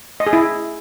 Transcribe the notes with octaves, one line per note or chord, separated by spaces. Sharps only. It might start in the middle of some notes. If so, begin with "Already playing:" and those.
D#5
G#4
E4